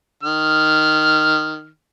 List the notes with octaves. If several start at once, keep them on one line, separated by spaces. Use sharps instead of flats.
D#3 F6